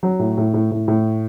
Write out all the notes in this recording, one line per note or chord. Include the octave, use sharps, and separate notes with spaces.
F#3
A2
A2
A2
A2
A2